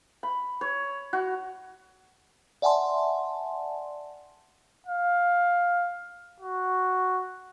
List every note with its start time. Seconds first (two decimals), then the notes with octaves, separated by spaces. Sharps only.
0.23 B5
0.61 C#5
1.13 F#4
2.62 D5 E5 F#5 G#5 A5 C6
4.87 F5
6.40 F#4